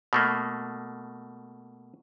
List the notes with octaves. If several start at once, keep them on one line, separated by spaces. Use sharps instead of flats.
B2 A3 A#3